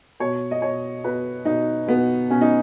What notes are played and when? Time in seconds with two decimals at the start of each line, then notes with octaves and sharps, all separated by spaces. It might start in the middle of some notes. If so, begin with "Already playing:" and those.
0.20 B2 C#5
0.51 D#5
0.62 B2 C#5
1.04 B2 B4
1.45 B2 D#4
1.87 B2 B3
2.30 B2 C#4
2.41 D#4